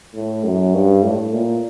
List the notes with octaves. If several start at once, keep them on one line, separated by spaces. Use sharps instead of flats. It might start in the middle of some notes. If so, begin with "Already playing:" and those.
A2
F#2
G2
A2
A#2